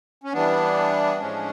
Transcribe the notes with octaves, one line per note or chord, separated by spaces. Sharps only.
C#4
E3 G3 B3 D4
A2 F3 G#3 C#4